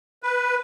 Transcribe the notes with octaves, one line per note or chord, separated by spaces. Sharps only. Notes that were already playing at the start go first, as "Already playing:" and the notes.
B4